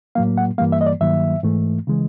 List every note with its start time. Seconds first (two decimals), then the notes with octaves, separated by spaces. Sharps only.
0.15 A2 F#3 A#3 F5
0.38 F#5
0.58 G2 E3 G3 A#3 F5
0.72 E5
0.81 D#5
0.86 D5
1.01 G2 D#3 F#3 A#3 E5
1.43 G#2 E3 A3
1.87 C#3 E3 G#3